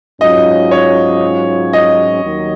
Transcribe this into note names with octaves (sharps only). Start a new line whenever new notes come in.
G#2 F#3 C#4 F4 D#5
C#5
D#5
D#2 D#3 F#3